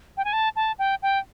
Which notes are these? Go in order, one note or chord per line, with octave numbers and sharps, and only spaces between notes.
G5
G#5
A5
A5
G5
G5